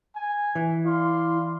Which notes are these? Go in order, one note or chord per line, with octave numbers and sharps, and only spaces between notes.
G#5
E3
E4 D5 F5 C6